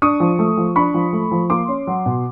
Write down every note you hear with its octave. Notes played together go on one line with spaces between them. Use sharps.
D4 C#6 D#6
F3
A3
F3
D4 B5 C#6
F3
A3
F3
A#3 C6 D6
C#4
F#3
B2